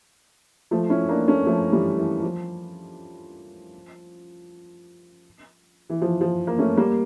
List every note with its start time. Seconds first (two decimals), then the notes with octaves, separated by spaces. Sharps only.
0.71 F3 A3
0.90 C#4 E4
1.09 A#3 D4
1.28 A3 C#4
1.46 F3 A3
1.72 E3 G3
1.98 E3
2.23 F3
5.90 E3
6.02 F3
6.21 F3
6.47 A#3
6.59 A3 C#4
6.77 G3 A#3